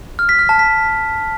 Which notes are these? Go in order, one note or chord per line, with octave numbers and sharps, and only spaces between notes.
F6
B6
F6
A5
B6